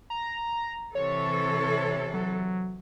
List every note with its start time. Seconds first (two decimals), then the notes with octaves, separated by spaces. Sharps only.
0.10 A#5
0.95 C3 E3 A4 C#5
2.14 F#3